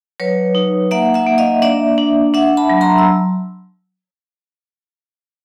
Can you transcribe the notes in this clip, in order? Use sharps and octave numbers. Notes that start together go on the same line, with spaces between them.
F#3 B4 C#5
D#4
A#3 E5 F#5
E5 F#5
A#3
D#5 F5
D4 D5 E5
D4
D4 E5 F#5
A5 B5
F#3
A#5 C6
E6